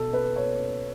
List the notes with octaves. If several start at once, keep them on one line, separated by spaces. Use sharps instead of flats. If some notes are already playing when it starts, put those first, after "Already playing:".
Already playing: B2 A4
B4
C#5